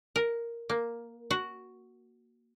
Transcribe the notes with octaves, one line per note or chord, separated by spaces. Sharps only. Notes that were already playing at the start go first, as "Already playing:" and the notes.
A#4
A#3
F#4